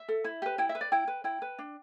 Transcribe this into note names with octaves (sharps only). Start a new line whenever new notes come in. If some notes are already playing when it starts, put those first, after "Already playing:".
Already playing: E5
A4
E4
G4 B4
E4 G5
E5
B4
D5
E4 G5
B4
E4 G5
B4
D4